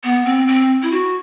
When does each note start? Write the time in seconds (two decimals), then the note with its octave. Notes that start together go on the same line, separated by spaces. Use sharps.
0.04 B3
0.25 C4
0.48 C4
0.83 E4
0.92 F#4